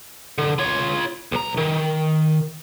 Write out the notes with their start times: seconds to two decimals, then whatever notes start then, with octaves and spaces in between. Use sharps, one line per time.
0.38 D3
0.59 F4 C#5
1.32 B1 A#5
1.57 D#3